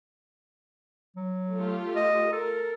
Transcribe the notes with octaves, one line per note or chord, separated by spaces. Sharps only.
F#3
A3 F4 G4
D#5
A4 A#4